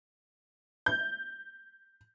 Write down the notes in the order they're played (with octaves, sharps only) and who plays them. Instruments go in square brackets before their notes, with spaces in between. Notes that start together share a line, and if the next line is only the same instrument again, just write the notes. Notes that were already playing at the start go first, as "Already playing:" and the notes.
[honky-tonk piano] G6